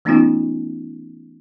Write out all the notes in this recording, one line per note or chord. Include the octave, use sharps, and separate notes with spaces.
E3 A3 B3 C#4 D#4 F4